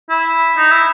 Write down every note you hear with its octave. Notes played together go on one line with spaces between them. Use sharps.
E4
D#4
E4